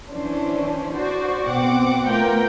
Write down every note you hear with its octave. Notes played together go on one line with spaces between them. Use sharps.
E3 C#4 D4 C5
F#4 C5 D5
B2 C4 F#5 D6
A3 B3 F4 A#4 G5